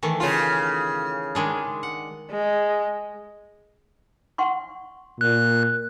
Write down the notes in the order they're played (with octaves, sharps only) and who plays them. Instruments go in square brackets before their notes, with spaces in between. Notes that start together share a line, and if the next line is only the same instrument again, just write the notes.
[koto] D#3 E3 A3
[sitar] C#3 F4
[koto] D#3 G#3 D4
F#5
[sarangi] G#3
[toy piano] F#5 C6 C#6
[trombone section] A#2 [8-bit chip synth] F#6